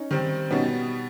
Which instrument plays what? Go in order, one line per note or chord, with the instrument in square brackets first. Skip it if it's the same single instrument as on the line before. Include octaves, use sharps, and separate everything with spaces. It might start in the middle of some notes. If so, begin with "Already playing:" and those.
Already playing: [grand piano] C#4 D#4
[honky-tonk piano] D#3 G3 C4
[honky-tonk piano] B2 G3 B3 [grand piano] C#4 D#4